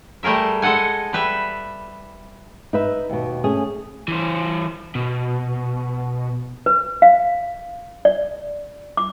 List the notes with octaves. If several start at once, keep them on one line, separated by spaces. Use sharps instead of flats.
G3 A3 G#4 A#4 E5
G#3 A4 D#5 F#5 G#5
G3 B4 E5
D#4 B4 E5
D#2 B2
A3 C#4 G#4
E3 C5
B2
B4
F5
D5
D6